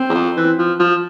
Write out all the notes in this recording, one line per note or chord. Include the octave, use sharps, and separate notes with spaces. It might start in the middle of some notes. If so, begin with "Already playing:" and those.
Already playing: C4
E2
F2
E3
F3
F3